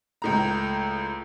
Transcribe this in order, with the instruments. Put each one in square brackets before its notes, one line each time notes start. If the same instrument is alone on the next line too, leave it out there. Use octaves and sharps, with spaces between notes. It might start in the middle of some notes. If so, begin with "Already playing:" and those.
[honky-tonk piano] C#2 A2 A#5